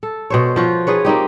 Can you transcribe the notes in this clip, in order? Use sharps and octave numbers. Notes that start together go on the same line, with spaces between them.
A4
B2 C5 C#5
F3 F4 F#4
D#4 G#4 B4 C#5
A#3 C4 D#4 G4